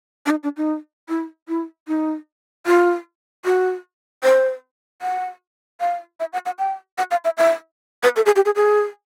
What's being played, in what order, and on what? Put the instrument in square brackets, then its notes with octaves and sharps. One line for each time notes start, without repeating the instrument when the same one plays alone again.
[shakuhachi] D4
D#4
D4
D#4
E4
E4
D#4
F4
F#4
C5
F#5
F5
E5
F#5
F#5
G5
F#5
F5
E5
E5
B4
A4
G#4
G4
G#4
G#4